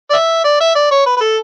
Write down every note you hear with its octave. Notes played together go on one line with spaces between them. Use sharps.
D5
E5
D5
E5
D5
C#5
B4
B4
A4